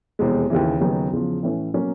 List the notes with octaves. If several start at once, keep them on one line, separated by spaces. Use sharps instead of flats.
F1 E2 B2 G#3
D#2 C#3 E3
D#2 C#3 F#3 B3 D#4
E2 C#3 F3
A2 E3 A3 C#4
B2 F#3 A#3 C#4